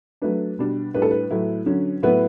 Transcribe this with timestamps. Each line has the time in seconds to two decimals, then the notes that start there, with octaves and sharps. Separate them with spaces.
0.22 F#3 A3 D4 B4
0.59 B2 G3 D4
0.94 A2 G3 D4 B4
1.02 A4
1.11 B4
1.31 A2 F#3 A3 E4
1.66 D3 F#3 C#4
2.03 A2 F#3 B3 E4 B4